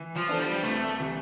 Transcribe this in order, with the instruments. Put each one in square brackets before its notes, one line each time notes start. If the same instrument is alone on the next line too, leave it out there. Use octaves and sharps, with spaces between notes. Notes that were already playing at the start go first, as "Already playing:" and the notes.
Already playing: [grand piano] E3
[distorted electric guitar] F3
[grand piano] B3 D4 A4 C5
[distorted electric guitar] G3
[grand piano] C2 [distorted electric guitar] A3
[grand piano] C3 E3